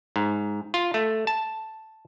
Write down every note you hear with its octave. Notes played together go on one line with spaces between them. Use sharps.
G#2
F4
A3
A5